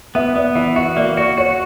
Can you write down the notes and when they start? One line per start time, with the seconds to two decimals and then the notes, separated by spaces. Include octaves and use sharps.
0.15 B3 E5
0.36 B3 D5
0.55 E3 E5
0.76 F#4 E5
0.96 A#3 D5
1.17 F#4 D5
1.38 F#4 C#5